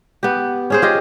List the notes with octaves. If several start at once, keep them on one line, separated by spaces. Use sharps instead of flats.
B3 G4
C#4 G#4 C5
F4 G4 D#5